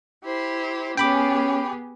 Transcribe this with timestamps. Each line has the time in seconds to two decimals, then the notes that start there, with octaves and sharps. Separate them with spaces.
0.23 E4 G4 C5
0.97 B3 C#4 G4 G#4 G5 B5 D6